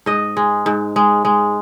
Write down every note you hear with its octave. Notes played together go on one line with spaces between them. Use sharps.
G#2 D#5
G#3
G#2
G#3
G#3